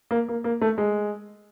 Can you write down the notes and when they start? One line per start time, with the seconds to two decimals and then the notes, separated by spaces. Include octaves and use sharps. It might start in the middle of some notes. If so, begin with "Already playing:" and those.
0.11 A#3
0.29 A#3
0.44 A#3
0.62 A3
0.78 G#3